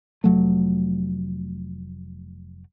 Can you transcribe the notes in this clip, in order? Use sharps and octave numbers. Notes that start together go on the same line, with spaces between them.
F1 F#3 A3